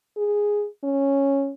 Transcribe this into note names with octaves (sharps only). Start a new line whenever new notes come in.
G#4
C#4